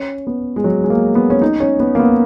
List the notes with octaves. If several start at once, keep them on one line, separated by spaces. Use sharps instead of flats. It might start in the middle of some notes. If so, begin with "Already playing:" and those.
Already playing: C#4
B3
G#3
F#3
G#3
A#3
B3
C#4
D#4
C#4
B3
A#3
B3